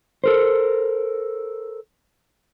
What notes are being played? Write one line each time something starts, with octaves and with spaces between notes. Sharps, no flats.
A4 A#4 C5